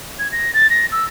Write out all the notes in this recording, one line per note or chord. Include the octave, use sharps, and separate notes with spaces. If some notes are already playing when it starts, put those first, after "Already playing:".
G#6
A#6
A6
A#6
E6